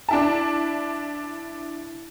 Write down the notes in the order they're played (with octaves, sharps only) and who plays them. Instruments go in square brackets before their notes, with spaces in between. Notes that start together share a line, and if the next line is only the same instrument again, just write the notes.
[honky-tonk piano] D4 E4 A5